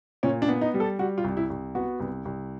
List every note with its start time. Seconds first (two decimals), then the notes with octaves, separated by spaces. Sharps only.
0.23 A#2 C#4
0.42 D4
0.48 B3
0.61 D#4
0.74 G3
0.80 A4
0.99 G3 F#4
1.18 F4
1.24 C2
1.37 E4
1.50 C2
1.75 B3 F#4
2.00 C2
2.25 C2